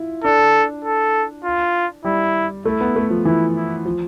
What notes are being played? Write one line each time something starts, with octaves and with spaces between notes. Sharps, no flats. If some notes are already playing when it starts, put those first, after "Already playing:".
Already playing: E4 F4
D4 A4
A4
F4
G3 E4
A3 E4
B3
A3
F3
E3 E4
E4
F3